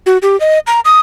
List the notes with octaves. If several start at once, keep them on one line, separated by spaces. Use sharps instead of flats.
F#4
G4
D#5
A#5
D#6